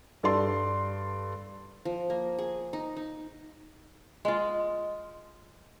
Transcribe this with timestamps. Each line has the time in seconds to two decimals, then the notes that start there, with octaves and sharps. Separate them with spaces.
0.23 G2 A4 D5 C6
1.85 F3
2.10 A#3
2.39 G#4
2.73 D#4
2.97 D#4
4.25 G#3 F4